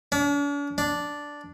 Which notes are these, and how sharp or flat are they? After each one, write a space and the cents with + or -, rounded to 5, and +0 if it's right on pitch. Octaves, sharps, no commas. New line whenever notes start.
D4 -45
D4 -5